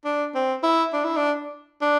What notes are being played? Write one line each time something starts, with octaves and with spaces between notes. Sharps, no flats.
D4
C4
E4
D4
E4
D4
D4